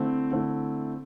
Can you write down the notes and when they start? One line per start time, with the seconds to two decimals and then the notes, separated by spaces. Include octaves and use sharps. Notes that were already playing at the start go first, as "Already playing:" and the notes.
Already playing: D3 A3 C4 E4
0.31 D3 A3 C4 E4